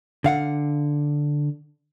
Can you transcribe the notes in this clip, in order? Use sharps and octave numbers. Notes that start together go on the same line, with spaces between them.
D3 F5 F#5